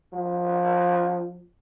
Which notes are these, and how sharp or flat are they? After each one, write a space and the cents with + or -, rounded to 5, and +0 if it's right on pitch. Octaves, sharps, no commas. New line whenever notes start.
F3 +15